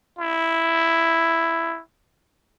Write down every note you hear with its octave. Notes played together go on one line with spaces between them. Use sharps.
E4